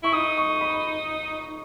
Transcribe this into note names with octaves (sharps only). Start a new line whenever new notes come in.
E4 C#6
D#4 D#6
C#6
B5